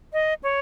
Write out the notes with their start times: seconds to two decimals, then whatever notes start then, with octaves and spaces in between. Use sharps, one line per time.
0.13 D#5
0.43 C#5